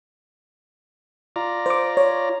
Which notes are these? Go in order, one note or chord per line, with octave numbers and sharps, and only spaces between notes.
F4 D5 A#5
C5 D6
C#5